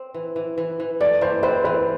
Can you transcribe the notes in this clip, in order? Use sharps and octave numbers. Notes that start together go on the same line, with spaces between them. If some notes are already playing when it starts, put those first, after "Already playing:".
Already playing: C4
E3
E3
E3
E3
A3 D5
E3 C5
C4 B4
E3 B4